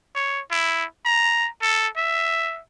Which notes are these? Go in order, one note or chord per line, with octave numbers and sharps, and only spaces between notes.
C#5
E4
A#5
A4
E5